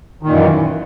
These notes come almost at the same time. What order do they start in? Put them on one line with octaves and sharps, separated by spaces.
D#3 A#2 F#2 E3